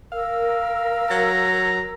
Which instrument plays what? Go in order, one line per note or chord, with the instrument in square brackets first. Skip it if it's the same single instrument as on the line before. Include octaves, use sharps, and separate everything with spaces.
[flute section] A#4 E6 [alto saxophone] F5
[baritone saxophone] F#3 [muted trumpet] A#5